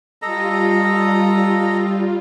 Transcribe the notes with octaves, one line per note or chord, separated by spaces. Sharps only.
G3 F4 A4 D#5 A#5